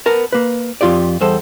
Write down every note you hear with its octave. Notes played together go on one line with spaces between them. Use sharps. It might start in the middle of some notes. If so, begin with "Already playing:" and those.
B3 A#4 A5
A#3 B4
F2 G#2 F4 G4 D5
E2 G3 A4 C5